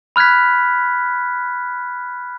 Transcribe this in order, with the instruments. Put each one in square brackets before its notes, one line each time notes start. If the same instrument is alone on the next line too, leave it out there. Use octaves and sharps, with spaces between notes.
[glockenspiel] B5 F6 F#6 G#6 B6